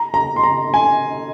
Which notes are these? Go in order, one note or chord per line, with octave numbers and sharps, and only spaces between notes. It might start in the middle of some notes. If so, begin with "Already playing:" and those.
Already playing: A#5
A#5
C6
A#5
G#5